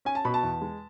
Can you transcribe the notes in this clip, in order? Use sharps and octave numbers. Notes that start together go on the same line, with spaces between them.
C#4 G#5
A5
B2 B5
A5
E2
G#3